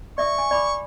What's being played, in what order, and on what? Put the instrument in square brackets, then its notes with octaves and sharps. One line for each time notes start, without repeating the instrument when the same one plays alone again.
[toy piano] D5 E5 D#6 [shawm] C#6
[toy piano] G#5
D5 B5 D6